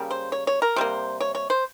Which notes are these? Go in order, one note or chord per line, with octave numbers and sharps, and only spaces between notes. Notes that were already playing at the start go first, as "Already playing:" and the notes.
Already playing: C#3 G3 A#3
C5
C#5
C#5
A#4
C3 G3 A#3 C5
C#5
C#5
C5